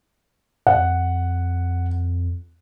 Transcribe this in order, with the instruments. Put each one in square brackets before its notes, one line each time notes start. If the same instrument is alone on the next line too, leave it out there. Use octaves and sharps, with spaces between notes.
[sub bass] F2 [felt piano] F#5